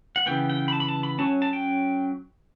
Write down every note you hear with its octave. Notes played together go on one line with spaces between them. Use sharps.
F#5
C#3 E3 B3 G5
G5
B5
A5
B5
A5
B5
F#3 C#4 A5
A5
G5